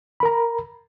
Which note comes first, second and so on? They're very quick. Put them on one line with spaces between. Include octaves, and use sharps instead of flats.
B5 A#4 A#5